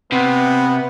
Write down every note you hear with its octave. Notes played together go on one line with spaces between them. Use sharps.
C3 B3